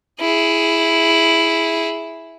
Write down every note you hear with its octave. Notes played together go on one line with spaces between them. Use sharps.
E4 G#4